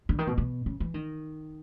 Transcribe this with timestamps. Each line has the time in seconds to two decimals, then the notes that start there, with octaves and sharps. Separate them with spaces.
0.09 D3
0.18 D#3
0.27 B2
0.38 B2
0.66 C#3
0.80 E3
0.94 D#3